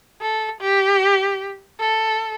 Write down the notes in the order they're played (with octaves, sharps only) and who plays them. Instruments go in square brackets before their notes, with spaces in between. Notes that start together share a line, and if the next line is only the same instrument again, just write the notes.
[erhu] A4
G4
A4